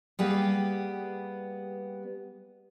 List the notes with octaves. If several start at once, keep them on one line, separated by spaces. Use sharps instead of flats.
G3 A#3 B3 G4 G#4 B4